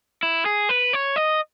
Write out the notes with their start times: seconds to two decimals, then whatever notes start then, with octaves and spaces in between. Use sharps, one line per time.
0.23 E4
0.46 G#4
0.69 B4
0.93 C#5
1.16 D#5